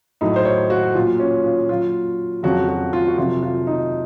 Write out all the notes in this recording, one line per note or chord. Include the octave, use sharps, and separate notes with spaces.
A2 F#3 D#4
C5
C#5
F#4
A#2 F#3 F4
C#4
F4
A#2 F#3 F4
F2 C#3 F#3 F#4
F#4
F4
F#4
F2 C3 F#3 F4
F4
D#4